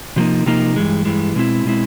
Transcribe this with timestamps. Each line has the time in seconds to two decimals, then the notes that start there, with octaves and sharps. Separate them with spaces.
0.16 C3 F3 A#3 D#4
0.46 C3 F3 A#3 D#4
0.76 G2 E3 G#3
1.05 G2 E3 G#3
1.35 B2 G#3 C4 E4
1.65 B2 G#3 C4 E4